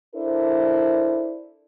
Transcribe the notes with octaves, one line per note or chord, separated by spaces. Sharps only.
D4 E4 A4 A#4 C5 D5